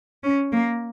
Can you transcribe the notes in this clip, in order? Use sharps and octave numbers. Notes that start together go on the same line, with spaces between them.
C#4
A#3